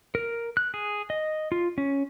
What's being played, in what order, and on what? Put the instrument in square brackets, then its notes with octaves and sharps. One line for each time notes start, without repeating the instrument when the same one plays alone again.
[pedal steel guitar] A#4
F#6
G#4
D#5
F4
C#4